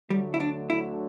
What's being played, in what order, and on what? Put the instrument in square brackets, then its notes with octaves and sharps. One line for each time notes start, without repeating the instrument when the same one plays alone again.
[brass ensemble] D2 D3 F#3 A3 [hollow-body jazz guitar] G3
[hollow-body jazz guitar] E4
D4
E4